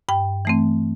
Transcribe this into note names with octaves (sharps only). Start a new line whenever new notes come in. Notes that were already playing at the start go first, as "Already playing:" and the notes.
G2 G5
E3 A3 C4